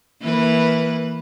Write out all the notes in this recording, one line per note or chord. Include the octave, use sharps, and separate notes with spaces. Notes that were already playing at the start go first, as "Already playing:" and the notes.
E3 A#3 B4